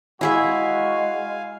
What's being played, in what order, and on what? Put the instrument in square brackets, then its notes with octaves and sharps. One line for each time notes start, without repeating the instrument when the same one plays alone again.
[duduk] G#3 [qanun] E4 G#4 E5 [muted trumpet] F#4 [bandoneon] F5 G#5